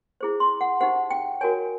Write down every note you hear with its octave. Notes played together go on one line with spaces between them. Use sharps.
E4 G#4 C5
C6
F#5
D#4 G4 C5 F#5
G5
F#4 A#4 C#5 G#5